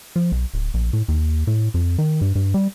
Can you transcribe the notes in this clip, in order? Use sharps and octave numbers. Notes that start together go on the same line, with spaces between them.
F3
B1
D1
A#1
A2
D#2
A2
F2
D#3
G2
G2
G3